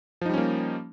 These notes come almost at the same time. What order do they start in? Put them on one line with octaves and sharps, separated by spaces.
F3 D#4 G3 C#4 A#3